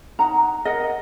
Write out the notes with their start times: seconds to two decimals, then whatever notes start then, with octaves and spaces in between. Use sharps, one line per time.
0.19 D#4 F#5 A#5
0.65 A#4 D#5 F#5